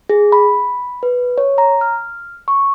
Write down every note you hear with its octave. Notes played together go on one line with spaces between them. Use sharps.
G#4
B5
B4
C#5
A#5
F6
C#6